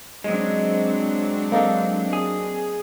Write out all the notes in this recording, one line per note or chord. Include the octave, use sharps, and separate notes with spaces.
F#3 G#3 C4 D4
A#3 D#4 A4
G#4